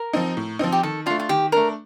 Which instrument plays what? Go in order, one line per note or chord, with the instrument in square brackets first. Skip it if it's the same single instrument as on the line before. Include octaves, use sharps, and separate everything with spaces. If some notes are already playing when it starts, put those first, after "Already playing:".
Already playing: [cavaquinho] A#4
[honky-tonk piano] F3 C4 D#4
A2
F3 C4 D#4
[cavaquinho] G4
[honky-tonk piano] D#3 [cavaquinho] A4
[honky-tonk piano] A3 D4 [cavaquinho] F4
[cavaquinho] F4
[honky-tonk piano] D#3 [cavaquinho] G4
[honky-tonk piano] A3 D4 [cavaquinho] A#4